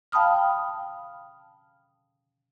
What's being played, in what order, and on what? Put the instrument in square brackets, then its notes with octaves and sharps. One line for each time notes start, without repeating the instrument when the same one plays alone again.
[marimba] F5 G5 A5 B5 D#6 F6